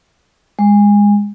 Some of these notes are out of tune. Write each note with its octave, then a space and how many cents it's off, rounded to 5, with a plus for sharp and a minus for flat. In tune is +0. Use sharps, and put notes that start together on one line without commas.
G#3 -20